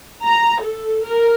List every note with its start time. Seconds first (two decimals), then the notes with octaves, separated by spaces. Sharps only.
0.24 A#5
0.61 A4
1.05 A#4